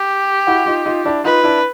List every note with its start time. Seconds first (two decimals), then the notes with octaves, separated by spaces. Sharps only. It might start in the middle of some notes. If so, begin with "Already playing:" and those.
Already playing: G4
0.47 E4 F#4
0.66 D#4 F4
0.86 D#4 F4
1.05 D4 E4
1.24 D#4 F4 B4
1.44 D4 E4